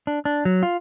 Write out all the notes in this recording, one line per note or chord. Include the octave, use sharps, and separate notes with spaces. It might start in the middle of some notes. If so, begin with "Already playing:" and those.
D4
D4
F#3
F4